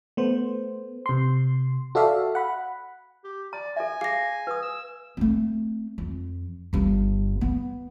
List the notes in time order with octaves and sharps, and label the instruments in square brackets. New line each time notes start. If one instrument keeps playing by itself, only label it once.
[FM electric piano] A3 B3 C5
C3 C6
F#4 A4 D5 E5 F5
F#5 B5
[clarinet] G4
[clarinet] D5 [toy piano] A#5
[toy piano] A4 E5 [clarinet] G#5
[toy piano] G#4 [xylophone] F5 A#6
[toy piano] B4 D#6
[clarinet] E6
[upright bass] A3 C4
F2
G1 G2
B3